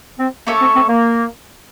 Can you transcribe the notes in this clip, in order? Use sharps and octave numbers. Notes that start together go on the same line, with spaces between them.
C4
A3 A#3 C#4 A4 C#5
C4
C4
A#3